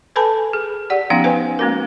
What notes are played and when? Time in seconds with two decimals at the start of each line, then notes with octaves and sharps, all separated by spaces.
0.16 A4 B4 G#5 A5 B5
0.53 G#4
0.90 G4 D5 F#5
1.10 F3 B3 C#4 D#4 F5 G5
1.24 B4 C5 F5 G#5
1.59 G#3 A#3 C#4 F#4 A#4